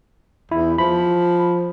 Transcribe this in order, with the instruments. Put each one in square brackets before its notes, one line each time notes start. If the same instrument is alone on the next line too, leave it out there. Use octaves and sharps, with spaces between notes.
[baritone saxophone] E2 [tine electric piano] E4
[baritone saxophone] F3 [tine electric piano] B5